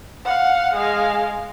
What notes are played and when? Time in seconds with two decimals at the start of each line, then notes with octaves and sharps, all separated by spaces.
0.25 F5 F#5
0.74 G#3 F5